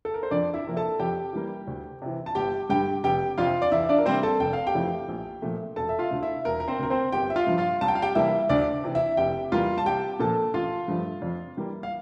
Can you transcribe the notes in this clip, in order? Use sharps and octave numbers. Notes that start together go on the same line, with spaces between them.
A4
A#4
C5
F2 D4 D5
E4 E5
C3 F3 A#3
A4 A5
F2 G4 G5
E3 G3 A#3
D2
C3 E3
A5
G1 G4 G5
G2 D3 G4 G5
F1 G4 G5
F2 C3 F3 F4 F5
D5
E2 E4 E5
D4 D5
A#4
C3 G3 A#3 C4 C5
A4 A5
F1 G5
F5
G4 G5
F2 E3 A3
A#1
A#2 F3 A3
E1 A4 A5
E5
F4 F5
D2 D3 A3
E4 E5
E1 A#4
A#4
C4 C5
D2 D3 A#4
C4 C5
G1 G4 G5
E5
F4 F5
G2 F3
F4 F5
C2 A5
G5
F5
G4 G5
C3 E3 G3 A#3 E4 E5
D2 D4 D5
C3 E3
E4 E5
F1 G4 G5
E2 E3 G3 A#3 F4 F5
A5
C2 G4 G5
A#2 F3 A#3 A4 A5
A1 F4 F5
G2 F3 A3
F2
E3 G3 A#3
F5